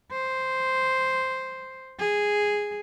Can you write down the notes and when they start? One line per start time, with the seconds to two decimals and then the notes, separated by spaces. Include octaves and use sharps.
0.11 C5
1.99 G#4